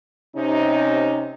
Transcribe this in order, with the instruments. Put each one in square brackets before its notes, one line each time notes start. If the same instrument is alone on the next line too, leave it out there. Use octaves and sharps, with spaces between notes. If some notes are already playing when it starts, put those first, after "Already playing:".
[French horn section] C3 C#4 D#4